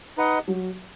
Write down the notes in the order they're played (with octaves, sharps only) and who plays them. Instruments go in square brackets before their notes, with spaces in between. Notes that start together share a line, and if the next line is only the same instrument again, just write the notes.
[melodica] D#4 B4 D#5 F#5
[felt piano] F#3